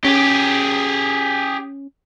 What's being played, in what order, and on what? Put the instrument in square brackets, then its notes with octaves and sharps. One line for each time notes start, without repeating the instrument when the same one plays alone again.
[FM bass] C#4 [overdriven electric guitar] G4 G#4